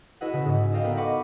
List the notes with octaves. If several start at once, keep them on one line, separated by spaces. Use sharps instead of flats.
E4 F#4 G#4 B4 D#5 F#5
C#3
G#2 C#3
A4 D5 D#5 F5 G5
B3 A#4 B4
D#5 F#5 B5 C#6 D6